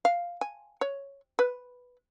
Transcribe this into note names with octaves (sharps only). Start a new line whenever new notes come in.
F5
G#5
C#5
B4